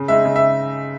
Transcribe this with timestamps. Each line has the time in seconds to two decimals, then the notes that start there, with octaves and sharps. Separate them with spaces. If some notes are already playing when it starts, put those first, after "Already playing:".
Already playing: C#3
0.08 G#3 D#4 E5
0.25 C#3
0.36 E5